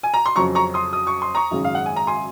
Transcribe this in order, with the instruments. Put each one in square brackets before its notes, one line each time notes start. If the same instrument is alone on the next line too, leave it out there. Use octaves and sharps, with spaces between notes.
[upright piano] G#5
A#5
C6
F2 C#3 F#3 C#4 A#5 C#6
A#5 C#6
C6 D#6
D#6
C#6
C6
A#5 C#6
G#1 F#2 C#3 G#3 C#4
F5
F#5
G#5
A#5
G#5 C6